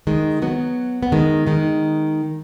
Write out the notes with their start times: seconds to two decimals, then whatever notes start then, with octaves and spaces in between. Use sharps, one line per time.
0.07 D#3 G#3
0.42 F#3 B3
1.03 B3
1.12 D#3 G#3
1.47 D#3 G#3